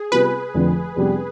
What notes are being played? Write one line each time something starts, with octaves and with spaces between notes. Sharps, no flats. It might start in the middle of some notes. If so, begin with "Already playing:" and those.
Already playing: G#4
C3 G3 B3 F4 B4
F1 F2 D3 F3 C4
F2 C3 G3 B3 D4